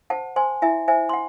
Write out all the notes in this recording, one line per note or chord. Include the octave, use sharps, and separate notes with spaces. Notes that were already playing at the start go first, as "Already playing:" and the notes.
C5 F#5 A5
C5 G#5 C6
E4 E5 G#5
C5 E5 G#5
C6
F#5